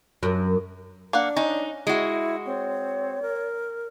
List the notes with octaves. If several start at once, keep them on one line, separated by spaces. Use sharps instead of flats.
F#2
A#3 D4 F5 F#5
C#4 D#4
G#3 E4 F#4
C4 C#5
A#4